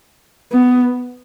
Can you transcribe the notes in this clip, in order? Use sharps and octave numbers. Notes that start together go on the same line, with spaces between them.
B3